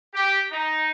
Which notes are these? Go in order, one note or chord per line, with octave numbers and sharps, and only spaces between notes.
G4
D#4